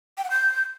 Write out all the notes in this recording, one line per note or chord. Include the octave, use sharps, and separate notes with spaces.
G5
F#5
G6